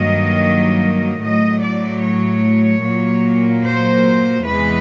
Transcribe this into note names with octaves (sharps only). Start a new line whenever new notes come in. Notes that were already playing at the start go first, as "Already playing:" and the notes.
Already playing: G2 D#3 F#3 A#3 D#5
A2 F#3 A3 D#5
D5
C#5
A#2 F#3 A#3
C5
E2 C3 E3 G#3 B4